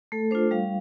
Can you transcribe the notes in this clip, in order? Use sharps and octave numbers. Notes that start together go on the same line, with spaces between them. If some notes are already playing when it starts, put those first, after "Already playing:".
A3 A4
D4 F4 C5
G3 F5